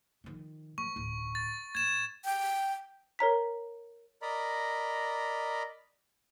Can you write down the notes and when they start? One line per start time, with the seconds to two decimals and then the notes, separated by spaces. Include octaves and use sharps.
0.24 D#3 F3
0.78 E3 A3 C#6
0.96 D1 B1
1.35 A6
1.75 A2 G#6 E7
2.25 G5
3.19 A#4 C#5 A#5 B6
4.22 A#4 D5 D#5 A#5 B5